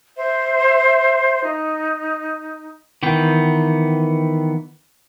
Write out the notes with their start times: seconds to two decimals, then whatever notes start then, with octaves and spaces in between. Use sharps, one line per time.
0.17 C5 E5
1.44 D#4
3.03 D#3 E3 B3 G5